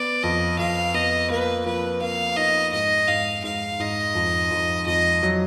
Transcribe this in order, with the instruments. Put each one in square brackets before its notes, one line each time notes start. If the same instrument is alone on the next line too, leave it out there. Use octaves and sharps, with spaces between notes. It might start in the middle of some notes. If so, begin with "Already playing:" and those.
Already playing: [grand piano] B3 [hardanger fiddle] D5
[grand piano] F2 [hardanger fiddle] D#5
[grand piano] F2 [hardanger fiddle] F5
[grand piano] B3 [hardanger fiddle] D#5
[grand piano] A#3 [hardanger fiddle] B4
[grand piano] F3 [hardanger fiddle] B4
[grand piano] A#3 [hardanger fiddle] F5
[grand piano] D#4 [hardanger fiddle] D#5
[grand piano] G#2 [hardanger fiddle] D#5
[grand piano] G#2 [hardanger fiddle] F5
[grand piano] G#2 [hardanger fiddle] F5
[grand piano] G#2 [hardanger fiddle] D#5
[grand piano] F2
F2
[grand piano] F2 [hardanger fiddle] D#5
[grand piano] F#3